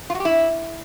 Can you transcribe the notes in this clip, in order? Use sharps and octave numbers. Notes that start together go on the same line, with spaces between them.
F4
F#4
G4
E4